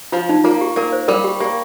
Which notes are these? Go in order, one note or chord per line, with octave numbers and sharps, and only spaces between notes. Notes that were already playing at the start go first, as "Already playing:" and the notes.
F3 F4
D#4
A#3 F4
G4
A#3 A#4
C5
G3 A#4
G4
A#3 G4